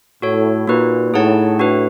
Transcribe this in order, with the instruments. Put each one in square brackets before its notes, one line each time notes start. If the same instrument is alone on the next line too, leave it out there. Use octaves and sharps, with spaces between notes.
[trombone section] A2 [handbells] F#4 A4 C#5
[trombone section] A#2 [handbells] A#3 D#4 F#4 B4
[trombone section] A2 [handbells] D#4 G#4 C#5 F#5 A5
[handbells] D4 F#4 B4